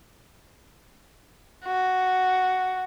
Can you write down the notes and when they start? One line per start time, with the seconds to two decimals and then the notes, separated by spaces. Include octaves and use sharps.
1.65 F#4